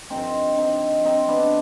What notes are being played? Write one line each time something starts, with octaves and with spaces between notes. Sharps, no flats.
G2 D3 F3 C4 D#4
C4 D#4
C4 D#4
B3 D4